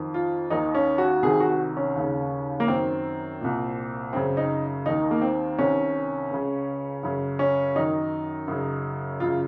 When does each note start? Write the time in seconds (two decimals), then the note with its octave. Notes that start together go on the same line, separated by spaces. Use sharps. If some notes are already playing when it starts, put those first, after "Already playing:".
Already playing: F2 D#3
0.14 F4
0.50 D#2 D#3 D#4
0.75 C#4
0.98 F#4
1.23 C2 C3 D#3 G#4
1.40 F#4
1.77 C#4
1.96 D#2 C#3
2.60 A#3
2.68 F#2 D#3 C4
3.41 C2 A#2
4.13 F#2 C#3 C4
4.37 D#4
4.86 D#2 D#3 D#4
5.11 A#3
5.22 C4
5.58 C2 C3 D#3 C#4
6.31 C#2 C#3
7.03 F#2 C#3
7.39 C#4
7.75 F#2 D#3 D#4
8.48 F#2 C#3
9.20 F#2 C#3 F4